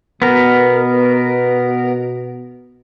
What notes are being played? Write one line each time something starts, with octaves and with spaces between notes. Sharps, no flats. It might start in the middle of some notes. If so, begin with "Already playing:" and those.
B2 B3 A#4